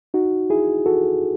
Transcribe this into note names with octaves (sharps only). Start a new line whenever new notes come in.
D#4 F#4
E4 G#4
F#4 A4